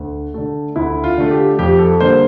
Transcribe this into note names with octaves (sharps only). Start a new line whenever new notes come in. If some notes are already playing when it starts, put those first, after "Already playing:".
Already playing: D2
D3 A3
D2 E4
F4
D3 A3
G4
F2 G4
A4
D3 G3 A#3 C5